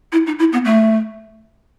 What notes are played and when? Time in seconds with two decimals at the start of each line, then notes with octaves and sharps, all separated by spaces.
0.12 E4
0.27 D#4
0.39 E4
0.53 B3
0.65 A3